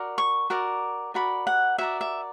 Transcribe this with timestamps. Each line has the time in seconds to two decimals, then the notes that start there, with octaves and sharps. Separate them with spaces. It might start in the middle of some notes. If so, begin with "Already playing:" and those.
Already playing: F#4 A#4 D5
0.18 C#6
0.50 F#4 A#4 D5
1.14 F#4 A#4 D5 B5
1.47 F#5
1.78 F#4 A#4 D5 E5
2.01 E5